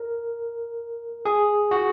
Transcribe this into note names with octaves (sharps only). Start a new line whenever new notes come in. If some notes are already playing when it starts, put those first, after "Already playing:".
Already playing: A#4
G#4
F#4